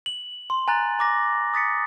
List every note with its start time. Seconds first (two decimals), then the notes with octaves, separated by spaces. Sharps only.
0.06 F#7
0.50 C6
0.68 G#5 A#5 F#6 A6
0.99 A#5 D6 A#6
1.54 D#6 A6 B6 C#7